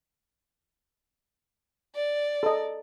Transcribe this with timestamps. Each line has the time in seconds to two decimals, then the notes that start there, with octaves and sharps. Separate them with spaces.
1.95 D5
2.43 A4 D#5